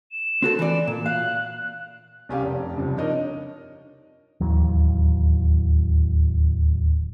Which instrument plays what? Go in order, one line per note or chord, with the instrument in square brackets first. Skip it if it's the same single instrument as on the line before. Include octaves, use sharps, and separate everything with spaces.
[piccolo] E7
[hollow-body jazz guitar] C4 F#4 A4
E3 D5
A#2
[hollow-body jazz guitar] F5 [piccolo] F#6
[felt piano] C2 C#4 G4 F5
F1
C#2 G2 C3 F3
D4 D#4 A#4 C#5 D#5
[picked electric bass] D1 D#2 E3 F#3